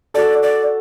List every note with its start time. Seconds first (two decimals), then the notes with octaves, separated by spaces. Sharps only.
0.14 F#4 A4 D5
0.43 D5